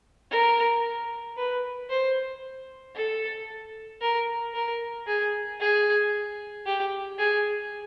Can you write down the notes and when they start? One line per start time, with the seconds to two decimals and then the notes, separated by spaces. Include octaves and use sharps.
0.31 A#4
1.37 B4
1.90 C5
2.95 A4
4.01 A#4
4.54 A#4
5.07 G#4
5.60 G#4
6.66 G4
7.19 G#4